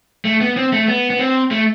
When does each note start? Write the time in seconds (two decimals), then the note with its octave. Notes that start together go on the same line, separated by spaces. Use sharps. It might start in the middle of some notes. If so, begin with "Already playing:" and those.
0.25 A3
0.41 B3
0.57 C4
0.72 A3
0.88 B3
1.10 B3
1.19 C4
1.51 A3